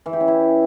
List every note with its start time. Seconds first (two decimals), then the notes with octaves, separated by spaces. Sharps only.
0.06 E3
0.13 G4
0.20 C#4
0.28 E4